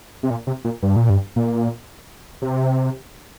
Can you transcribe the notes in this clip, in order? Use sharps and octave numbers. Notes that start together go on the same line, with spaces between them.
C3
A#2
C3
A#2
G2
A#2
G2
A#2
C3